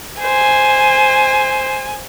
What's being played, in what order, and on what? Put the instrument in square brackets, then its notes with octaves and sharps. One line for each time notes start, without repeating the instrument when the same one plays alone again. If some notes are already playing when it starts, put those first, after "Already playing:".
[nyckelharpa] C5 [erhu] G#5